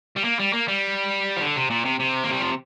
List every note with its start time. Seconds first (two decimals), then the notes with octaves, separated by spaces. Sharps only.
0.16 G3
0.24 A#3
0.39 G3
0.53 A#3
0.68 G3
1.37 F3
1.41 D3
1.56 C3
1.70 A#2
1.85 C3
2.00 C3
2.24 A#3
2.33 G3
2.41 F3